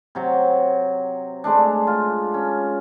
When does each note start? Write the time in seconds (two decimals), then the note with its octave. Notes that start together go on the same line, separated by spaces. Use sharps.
0.15 C3 F#3
1.44 G#3 A3 D4
1.87 F4
2.34 C#4